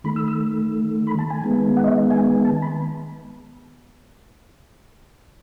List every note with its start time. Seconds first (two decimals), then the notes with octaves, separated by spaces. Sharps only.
0.04 D#3 A3 B5
0.16 E6
0.28 E6
1.07 B5
1.19 A5
1.30 G#5
1.42 D#3 G#3 B3
1.77 F#5
1.84 D#5
1.87 E5
2.11 G#5
2.45 A5
2.62 B5